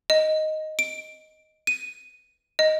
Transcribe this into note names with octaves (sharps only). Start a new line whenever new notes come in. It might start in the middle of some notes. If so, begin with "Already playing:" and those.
D#5
D7
D#7
D#5